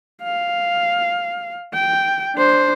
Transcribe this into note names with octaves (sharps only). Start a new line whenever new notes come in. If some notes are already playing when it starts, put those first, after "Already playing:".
F5
G5
D4 C5